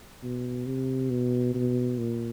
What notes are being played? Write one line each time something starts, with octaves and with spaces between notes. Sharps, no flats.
B2
C3
B2
B2
A#2